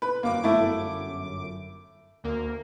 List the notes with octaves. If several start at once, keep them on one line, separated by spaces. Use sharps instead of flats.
B4
G1 F#2 A#3 D6
A3 E4
D2 A#3